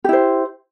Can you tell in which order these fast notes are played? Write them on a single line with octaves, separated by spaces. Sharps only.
G4 E4 C5